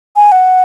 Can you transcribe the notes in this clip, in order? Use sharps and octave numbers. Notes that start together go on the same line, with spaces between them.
G#5
F#5